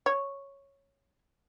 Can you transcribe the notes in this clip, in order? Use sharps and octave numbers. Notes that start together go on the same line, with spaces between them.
C#5